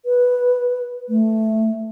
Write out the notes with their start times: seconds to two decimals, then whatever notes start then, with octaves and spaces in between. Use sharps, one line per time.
0.06 B4
1.09 A3